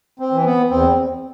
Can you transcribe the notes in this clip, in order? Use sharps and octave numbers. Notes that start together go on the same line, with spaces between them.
C4
E3
B3
E2 C4